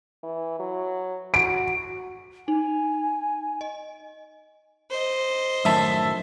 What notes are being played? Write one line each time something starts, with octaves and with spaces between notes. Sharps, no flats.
E3
F#3
F#4 D7
D#4 G#5
D#5
C5 D#5
F#2 A2 D#3 E5 A5